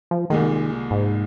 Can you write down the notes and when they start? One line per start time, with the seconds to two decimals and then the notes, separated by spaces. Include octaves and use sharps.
0.11 F3
0.30 C2 A#2 D#3 G#3
0.91 G#2